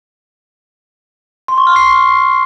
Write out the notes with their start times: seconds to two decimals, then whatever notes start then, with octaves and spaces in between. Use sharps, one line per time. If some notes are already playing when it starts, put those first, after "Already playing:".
1.48 C6
1.58 C#6
1.67 F6
1.76 C7